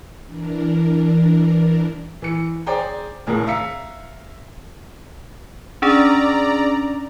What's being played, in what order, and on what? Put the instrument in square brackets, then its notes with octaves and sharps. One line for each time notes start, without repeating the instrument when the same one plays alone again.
[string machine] E3 D4 A#4
[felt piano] E3 C#7
G#4 C5 D5 G5 G#5 A#5
F1 D#2 A2 G#4 A#4
E5 F5 A#5 E6 B6 C#7
[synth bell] C#4 D4 G#4 [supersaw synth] D5 A#5